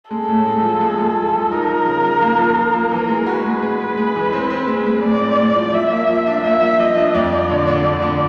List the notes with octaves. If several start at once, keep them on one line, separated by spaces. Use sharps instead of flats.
G#3 A4
A2
G#3
F3
G#3
G#3
F3
F3
D#4 A#4
F3
C#3
F3
A#3
F3
F3
A#3
E3 A#4
G#3
F#4 B4
G#3
G#3
G#3
G#3
E3
C4
C4
G#3
G#3
A2 D5
C4
A2
F3
F3 E5
A#3
F3
D4
A#3 E5
F3
F3 D#5
D4
F2 D5
F3
D3
D3
F3
D3